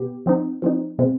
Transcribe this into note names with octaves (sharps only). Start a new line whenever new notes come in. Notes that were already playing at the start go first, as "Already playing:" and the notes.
Already playing: B2 B3 G4
F3 C4 D#4
F3 C4 D#4
B2 G#3 C4